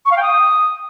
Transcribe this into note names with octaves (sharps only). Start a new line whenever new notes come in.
C#6
F5
G5
D#6